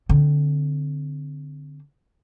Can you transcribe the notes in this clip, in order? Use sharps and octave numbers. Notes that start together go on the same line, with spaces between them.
D3 C4